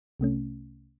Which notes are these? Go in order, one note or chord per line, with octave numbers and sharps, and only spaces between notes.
C2 C3 A3 C#4